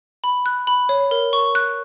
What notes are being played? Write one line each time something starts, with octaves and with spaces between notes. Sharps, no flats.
B5
F#6
B5
C#5
A#4
C#6
F#6